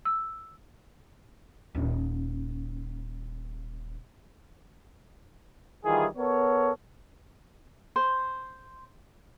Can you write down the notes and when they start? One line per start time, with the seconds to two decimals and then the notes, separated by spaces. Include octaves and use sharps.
0.05 E6
1.75 D#1 C#4
5.85 D#3 E3 G3 E4 F4 G#4
6.17 B3 A4 A#4 C#5
7.96 C5